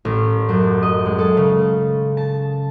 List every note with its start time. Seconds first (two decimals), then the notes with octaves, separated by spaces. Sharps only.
0.05 A1
0.49 F#2
0.83 D#5
1.05 G#3
1.19 A4
1.37 C#3
2.17 A5